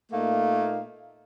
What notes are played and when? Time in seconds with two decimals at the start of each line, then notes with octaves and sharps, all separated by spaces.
0.12 A#2 A3 A#3 D#4 F5